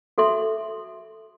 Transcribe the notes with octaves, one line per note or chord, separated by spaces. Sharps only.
F#4 A4 E5 C6